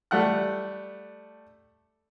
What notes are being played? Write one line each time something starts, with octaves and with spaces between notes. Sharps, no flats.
G3 A3 F#5 F#6